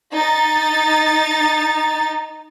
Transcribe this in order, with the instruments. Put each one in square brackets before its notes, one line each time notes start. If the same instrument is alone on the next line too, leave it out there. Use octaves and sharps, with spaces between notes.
[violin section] D#4 A6